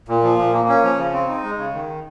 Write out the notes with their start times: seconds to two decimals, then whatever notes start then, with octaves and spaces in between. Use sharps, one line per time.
0.08 A#2
0.24 F3
0.39 A#2
0.53 A#3
0.69 C#4
0.83 F3
0.98 C#3
1.13 C4
1.29 D#4
1.43 G#3
1.58 C#3
1.74 D#3